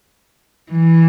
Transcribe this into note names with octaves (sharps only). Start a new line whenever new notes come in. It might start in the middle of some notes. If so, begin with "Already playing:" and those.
E3